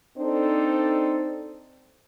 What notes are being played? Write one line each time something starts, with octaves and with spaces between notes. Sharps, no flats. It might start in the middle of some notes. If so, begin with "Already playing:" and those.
C4 D4 D#4 A4 C5 D5